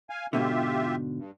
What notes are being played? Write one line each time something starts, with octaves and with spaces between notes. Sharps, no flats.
F5 G#5
G#2 B2 D3 F4 G4 E5
G2